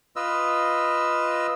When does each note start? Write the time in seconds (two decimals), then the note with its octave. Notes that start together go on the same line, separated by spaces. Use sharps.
0.16 F4 B4 D#5 E6